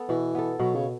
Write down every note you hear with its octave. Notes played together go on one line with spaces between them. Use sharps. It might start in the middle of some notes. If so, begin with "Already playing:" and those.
Already playing: B3 A4
B2 E3
B3 A4
B2 F#3
C#3